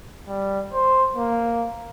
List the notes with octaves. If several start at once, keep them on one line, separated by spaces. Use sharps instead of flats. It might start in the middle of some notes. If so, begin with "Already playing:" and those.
G3
C5
A#3